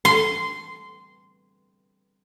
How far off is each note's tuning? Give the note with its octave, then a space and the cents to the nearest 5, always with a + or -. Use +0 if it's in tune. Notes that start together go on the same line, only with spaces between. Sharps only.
C6 -15